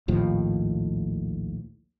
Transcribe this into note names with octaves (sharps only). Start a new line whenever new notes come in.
A#1 D#2 A2 F3